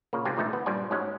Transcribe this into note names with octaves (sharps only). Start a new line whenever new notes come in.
A#2 C#3 A#3
G#2 C3 C4 G4 G#5 A5
A#2 D3 E3 A3 D#4 A4
B3
G2 A#2 G3 C5 D5 G#5
G#2 F#3 G#3 C#4